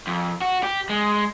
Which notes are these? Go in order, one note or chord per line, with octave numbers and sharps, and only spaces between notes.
F2
F#4
G4
G#3